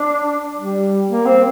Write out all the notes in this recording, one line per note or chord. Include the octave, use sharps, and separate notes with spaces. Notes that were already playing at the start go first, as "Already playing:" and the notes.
Already playing: D4
G3
A#3
C4